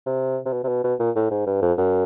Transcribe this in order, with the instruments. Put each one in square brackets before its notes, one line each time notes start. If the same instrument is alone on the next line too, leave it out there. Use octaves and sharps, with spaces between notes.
[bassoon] C3
C3
B2
C3
B2
B2
A#2
A2
G#2
G2
F2
F#2